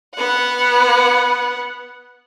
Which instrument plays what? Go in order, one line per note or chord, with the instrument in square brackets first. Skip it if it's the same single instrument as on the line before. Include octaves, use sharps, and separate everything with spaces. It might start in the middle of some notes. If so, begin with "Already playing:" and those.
[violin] B3 F#5